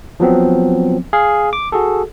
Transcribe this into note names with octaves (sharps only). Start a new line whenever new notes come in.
F3 F#3 B3 C4
G#4 F5
D6
F#4 G#4 A4